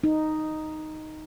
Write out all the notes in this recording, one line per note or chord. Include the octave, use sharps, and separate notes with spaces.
D#4